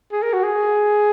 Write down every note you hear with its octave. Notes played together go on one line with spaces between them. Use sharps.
G#4
A#4
F#4
G#4